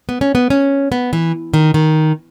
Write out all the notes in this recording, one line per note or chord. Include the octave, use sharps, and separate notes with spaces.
B3
C#4
B3
C#4
B3
E3
D#3
D#3